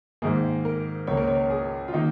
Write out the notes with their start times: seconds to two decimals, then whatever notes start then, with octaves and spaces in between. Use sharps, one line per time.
0.22 G#2 D#3 A#3 G#4
0.65 A#4
1.07 C#2 C#3 A#3 C#5
1.17 A#4
1.27 C#5
1.50 G#4
1.88 F4
1.93 D#3 A#3 D#4